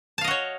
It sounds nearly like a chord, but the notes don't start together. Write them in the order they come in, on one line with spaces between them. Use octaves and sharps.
A5 F5 D#5 F#4 C#5